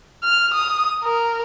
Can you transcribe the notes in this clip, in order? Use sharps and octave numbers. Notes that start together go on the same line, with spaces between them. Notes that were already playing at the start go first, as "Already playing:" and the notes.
F6
D#6
A#4